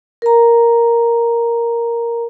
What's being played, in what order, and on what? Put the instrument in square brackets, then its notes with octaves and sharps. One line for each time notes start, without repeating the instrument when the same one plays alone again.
[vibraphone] A#4 A#5